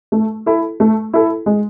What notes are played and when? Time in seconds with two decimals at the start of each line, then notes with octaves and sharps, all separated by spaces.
0.12 A3
0.46 E4 A4
0.80 A3
1.13 E4 A4
1.46 G#3